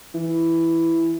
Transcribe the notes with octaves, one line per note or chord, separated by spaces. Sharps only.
E3